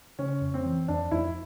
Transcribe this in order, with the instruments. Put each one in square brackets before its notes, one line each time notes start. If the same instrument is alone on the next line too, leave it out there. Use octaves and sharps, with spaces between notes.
[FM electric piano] C#3 [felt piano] C#4
[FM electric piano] F2
[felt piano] C4
[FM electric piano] E3
[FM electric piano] F2 [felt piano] D4
[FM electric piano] F2 [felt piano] E4